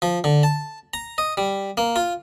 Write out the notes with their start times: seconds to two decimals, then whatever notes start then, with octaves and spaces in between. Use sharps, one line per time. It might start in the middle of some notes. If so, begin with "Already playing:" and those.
0.02 F3
0.24 D3
0.43 A5
0.94 A#5
1.18 D#5
1.37 G3
1.77 A#3
1.96 F4